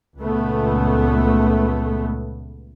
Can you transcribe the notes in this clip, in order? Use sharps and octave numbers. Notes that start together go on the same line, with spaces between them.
C#2 A#2 A3 B3